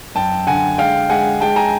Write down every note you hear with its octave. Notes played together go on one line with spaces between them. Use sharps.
F#2 G5 A5
D3 F#5 G#5
G#3 F5 G5
G#3 F#5 G#5
G#3 G5 A5
G#5 A#5